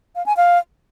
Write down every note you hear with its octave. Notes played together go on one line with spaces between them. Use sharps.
F5
G#5
F5